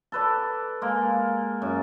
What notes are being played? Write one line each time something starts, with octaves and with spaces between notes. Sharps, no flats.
A4 B4 D5
G#3 A#3
F#2